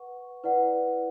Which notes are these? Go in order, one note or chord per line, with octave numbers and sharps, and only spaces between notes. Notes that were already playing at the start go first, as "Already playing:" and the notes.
Already playing: B4 F#5 C#6
E4 B4 D5 F#5